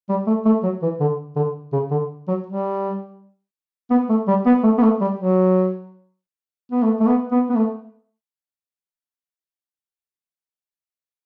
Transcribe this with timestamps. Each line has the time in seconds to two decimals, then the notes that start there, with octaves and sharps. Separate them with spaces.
0.09 G3
0.27 A3
0.45 A3
0.63 F#3
0.82 E3
1.00 D3
1.36 D3
1.73 C#3
1.91 D3
2.28 F#3
2.46 G3
3.91 B3
4.09 A3
4.28 G3
4.46 B3
4.64 A3
4.78 B3
4.82 A3
5.01 G3
5.19 F#3
6.72 B3
6.82 A3
7.00 A3
7.07 B3
7.32 B3
7.50 B3
7.56 A3